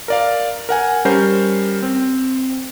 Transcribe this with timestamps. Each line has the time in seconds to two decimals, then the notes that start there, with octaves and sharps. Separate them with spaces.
0.08 A#4 D5 F5
0.69 A#4 F#5 G#5
1.05 G3 C#4 A#4 C5 G6 C7
1.82 C4